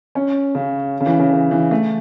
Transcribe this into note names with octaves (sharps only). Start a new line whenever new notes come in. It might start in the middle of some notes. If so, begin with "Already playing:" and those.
C#4
C#3
C#3
E3
C#3
C#3
E3
A3